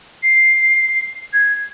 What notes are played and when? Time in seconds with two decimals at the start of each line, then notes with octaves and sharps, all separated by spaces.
0.23 C7
1.33 G#6